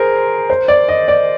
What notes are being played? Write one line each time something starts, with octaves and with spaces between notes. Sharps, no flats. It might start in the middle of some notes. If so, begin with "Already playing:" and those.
Already playing: G#4 A#4 C5
C5
D5
D#5
D5